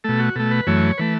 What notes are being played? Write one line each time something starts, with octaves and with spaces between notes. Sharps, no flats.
B2 A3 A4
F#4
B2 A3 A4
B4
F#2 E3 A3 C#5
E3 A3 B4